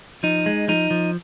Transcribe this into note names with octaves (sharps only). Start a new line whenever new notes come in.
F3 D#4
G#3
F3 D#4
F3